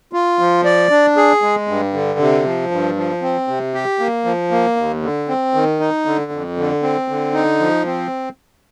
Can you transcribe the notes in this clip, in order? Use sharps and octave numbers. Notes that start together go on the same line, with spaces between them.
F4
F3
D5
D4
G#4
G#3
G2
D3
C3
F3
G2
F3
C4
C3
G4
A#3
F3
A#3
D#2
D3
C4
D#3
D#4
D3
F2
D3
C4
D3
D#4
F3
C4